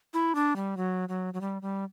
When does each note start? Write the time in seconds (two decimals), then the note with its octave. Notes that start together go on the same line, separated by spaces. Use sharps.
0.14 E4
0.35 D4
0.56 G3
0.77 F#3
1.09 F#3
1.34 F#3
1.41 G3
1.62 G3